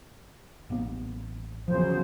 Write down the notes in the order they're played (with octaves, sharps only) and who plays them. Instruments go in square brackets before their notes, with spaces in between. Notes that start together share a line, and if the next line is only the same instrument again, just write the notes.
[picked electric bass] A1 A#3 B3
[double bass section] E2 C#3 F#3 [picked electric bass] F3 [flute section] C5